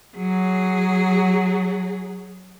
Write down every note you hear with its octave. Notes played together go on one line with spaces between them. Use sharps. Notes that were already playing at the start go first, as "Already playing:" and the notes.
F#3 G#4